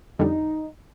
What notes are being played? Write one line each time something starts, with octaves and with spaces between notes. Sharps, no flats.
F2 D3 G3 D#4